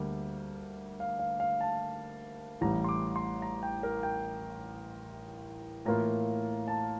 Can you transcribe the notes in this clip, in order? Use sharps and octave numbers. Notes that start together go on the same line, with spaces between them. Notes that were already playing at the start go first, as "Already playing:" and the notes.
Already playing: D2 D3 G3 A#3
F5
F5
F5
A5
A1 A2 E3 G3 A#5
C6
D6
C6
A#5
G5
A#4
G5
A2 E3 A#3 F4 A#5
A5